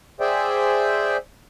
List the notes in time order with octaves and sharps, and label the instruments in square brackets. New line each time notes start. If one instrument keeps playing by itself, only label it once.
[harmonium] G#4 C5 D5 E5 G5